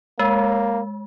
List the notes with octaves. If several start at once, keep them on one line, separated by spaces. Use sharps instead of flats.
G#3 A#3